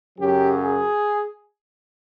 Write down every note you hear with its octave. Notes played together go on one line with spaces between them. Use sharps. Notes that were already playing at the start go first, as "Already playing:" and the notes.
F#2 C#3 F#3 G4
G#4